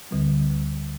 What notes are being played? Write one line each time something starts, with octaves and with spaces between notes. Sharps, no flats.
D2 D3 G3